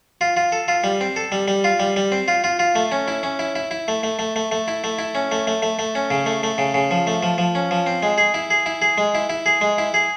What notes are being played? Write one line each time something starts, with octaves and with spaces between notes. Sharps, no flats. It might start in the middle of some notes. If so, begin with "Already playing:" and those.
F4
F4
A4
F4
G3
C4
A4
G3
G3
F4
G3
G3
C4
F4
F4
F4
A3
C#4
E4
C#4
E4
E4
E4
A3
A3
A3
A3
A3
E4
A3
E4
C#4
A3
A3
A3
A3
C#4
C#3
A3
A3
C#3
C#3
F3
A3
F3
F3
C#4
F3
C4
G#3
G#4
E4
G#4
E4
G#4
G#3
E4
E4
G#4
G#3
E4
G#4